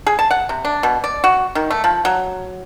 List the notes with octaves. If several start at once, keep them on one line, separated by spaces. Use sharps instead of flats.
G#4
A5
F#5
C3
D4
B2
D5
F#4
D#3
A3
F3
F#3